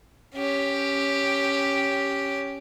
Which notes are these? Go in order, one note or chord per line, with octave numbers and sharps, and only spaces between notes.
C#4 G4